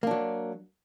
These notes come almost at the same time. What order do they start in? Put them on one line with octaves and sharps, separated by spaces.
A#3 D4 F#3